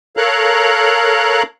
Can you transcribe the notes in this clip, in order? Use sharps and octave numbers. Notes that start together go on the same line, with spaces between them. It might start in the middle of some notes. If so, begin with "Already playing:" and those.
A4 A#4 C#5 F5 A#5 F#6